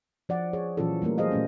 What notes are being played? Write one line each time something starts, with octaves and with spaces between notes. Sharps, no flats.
F3 D5 F#5
G#4 C#5
A#2 E3 F#3 C#4 F4 A4
G3 A3 A#3 A#4
F#3 G#4 C5 D#5 F5
A#2 A3 C#4